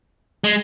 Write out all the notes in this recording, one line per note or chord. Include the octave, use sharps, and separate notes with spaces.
G#3